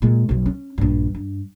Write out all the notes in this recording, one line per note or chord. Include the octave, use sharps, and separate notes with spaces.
A#2 G#3
B1 F#2
C#4
A#1 G2
G2